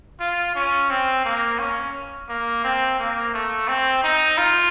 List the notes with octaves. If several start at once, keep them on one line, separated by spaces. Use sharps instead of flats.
F4
C#4
C4
A#3
C#4
A#3
C4
A#3
A3
C4
D#4
F4